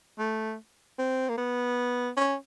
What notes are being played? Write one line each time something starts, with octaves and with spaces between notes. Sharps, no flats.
A3
C4
A#3
B3
C#4